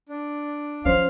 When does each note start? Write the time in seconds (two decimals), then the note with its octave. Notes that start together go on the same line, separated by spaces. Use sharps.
0.09 D4
0.85 F3 C#4 C5 F5